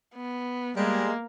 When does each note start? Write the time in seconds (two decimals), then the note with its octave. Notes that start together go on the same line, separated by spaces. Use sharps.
0.15 B3
0.77 G3 G#3 A#3